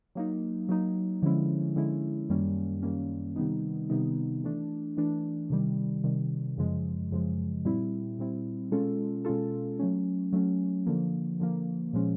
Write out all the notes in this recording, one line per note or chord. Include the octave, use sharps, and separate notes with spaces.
F#3 A#3 D#4
F#3 A#3 D#4
D3 F3 G#3 C#4 E4
D3 F3 G#3 C#4 E4
F#2 D#3 G3 A#3 C#4
F#2 D#3 G3 A#3 C#4
C3 D#3 G3 B3 D#4
C3 D#3 G3 B3 D#4
E3 A3 D4
E3 A3 D4
C3 D#3 G3
C3 D#3 G3
F#2 C#3 F3 G#3
F#2 C#3 F3 G#3
A#2 G3 C4 E4
A#2 G3 C4 E4
B2 G#3 C#4 F4 A4
B2 G#3 C#4 F4 A4
F#3 A3 C#4
F#3 A3 C#4
D3 F3 A#3
D3 F3 A#3
A#2 F3 G#3 C#4